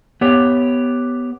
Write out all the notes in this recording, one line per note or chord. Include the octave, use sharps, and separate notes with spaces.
B3 G4 C#5